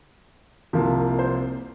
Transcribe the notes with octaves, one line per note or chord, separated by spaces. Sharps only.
C2 C3 F3 A#3
C5